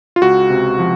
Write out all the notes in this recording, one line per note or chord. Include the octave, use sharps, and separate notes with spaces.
F4
C#2 F#4
C3
F3